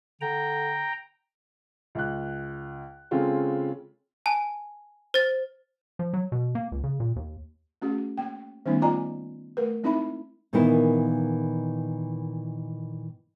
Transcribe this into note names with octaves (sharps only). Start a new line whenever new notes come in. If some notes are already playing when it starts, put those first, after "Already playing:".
D3 G5 A#5
C#2 F#6
C#3 G#3 C4 C#4 F4 A4
G#5 A5
C5 A6
F3
F#3
B2
A#3
C#2
C#3
A#2
D#2
A3 C#4 F#4 G#4
A#3 G5
D#3 G3 A3 B3 C#4 D#4
A#3 F4 D5 D#5 G#5 A#5
A3 A#4 B4
G#3 C4 D#4 E4 E5 B5
A#2 D#3 E3 A#3 B3 E4